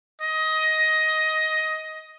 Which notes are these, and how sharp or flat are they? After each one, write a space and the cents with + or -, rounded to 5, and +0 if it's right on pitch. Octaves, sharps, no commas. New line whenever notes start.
D#5 +15